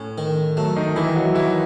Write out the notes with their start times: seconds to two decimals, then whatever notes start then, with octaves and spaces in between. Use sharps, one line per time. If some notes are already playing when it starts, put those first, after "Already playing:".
Already playing: A2 A3 C#4
0.18 D#3
0.57 F#3 A3
0.76 D#3 D#4
0.96 D#3 E3 E4
1.15 F#3 F#4
1.35 E3 F#3 E4